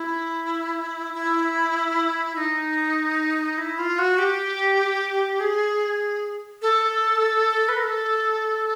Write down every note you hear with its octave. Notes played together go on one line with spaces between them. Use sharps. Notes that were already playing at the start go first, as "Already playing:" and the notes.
Already playing: E4
E4
D#4
E4
F4
F#4
G4
G#4
A4
B4
A#4
A4